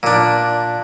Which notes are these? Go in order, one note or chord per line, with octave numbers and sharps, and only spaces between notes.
A#2 D4